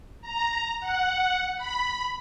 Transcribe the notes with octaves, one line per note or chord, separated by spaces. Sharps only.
A#5
F#5
B5